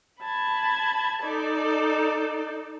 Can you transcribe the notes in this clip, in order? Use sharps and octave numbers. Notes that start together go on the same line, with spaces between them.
A5 B5 G#6
D#4 A4 D5